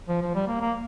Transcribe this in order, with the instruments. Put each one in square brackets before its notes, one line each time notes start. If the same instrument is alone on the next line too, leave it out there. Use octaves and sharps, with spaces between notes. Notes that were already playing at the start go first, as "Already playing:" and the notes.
[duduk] F3
F3
G3
A#3
A#3